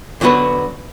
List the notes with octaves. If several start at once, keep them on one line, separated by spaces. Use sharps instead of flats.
D3 F#3 B3 F#4 B4